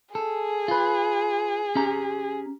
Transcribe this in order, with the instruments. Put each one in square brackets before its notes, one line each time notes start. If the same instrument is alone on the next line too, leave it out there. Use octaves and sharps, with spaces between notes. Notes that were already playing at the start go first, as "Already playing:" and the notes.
[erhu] G#4 [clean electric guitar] A4
[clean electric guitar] F4 B4
C#4 G4 A#5